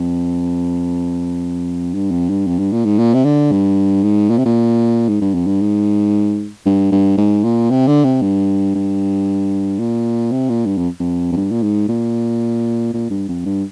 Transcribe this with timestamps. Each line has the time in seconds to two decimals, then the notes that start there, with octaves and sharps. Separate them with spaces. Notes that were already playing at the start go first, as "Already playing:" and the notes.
Already playing: F2
1.94 G2
2.11 F2
2.30 G2
2.47 F2
2.59 G2
2.72 A#2
2.85 G#2
2.99 A#2
3.14 C3
3.24 D3
3.51 G2
4.03 G#2
4.30 A#2
4.38 C3
4.45 A#2
5.09 G#2
5.22 G2
5.34 F2
5.47 G2
5.61 G#2
6.66 G2
6.92 G2
7.18 G#2
7.44 A#2
7.70 C3
7.87 D3
8.04 C3
8.22 G2
8.75 G2
9.79 A#2
10.32 C3
10.49 A#2
10.66 G2
10.78 F2
11.00 F2
11.32 F2
11.36 G2
11.51 A#2
11.63 G#2
11.88 A#2
12.94 A#2
13.10 G2
13.29 F2
13.46 G2